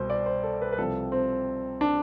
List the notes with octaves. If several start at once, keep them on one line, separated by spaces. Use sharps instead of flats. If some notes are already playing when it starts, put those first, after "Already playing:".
Already playing: C2 B2 C5
D5
C5
A4
B4
B4
C2 C3 F3 A4
C4
D4